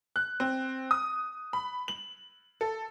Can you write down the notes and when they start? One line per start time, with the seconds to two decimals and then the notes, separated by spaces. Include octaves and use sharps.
0.16 F#6
0.40 C4
0.91 D#6
1.53 B5
1.88 F#7
2.61 A4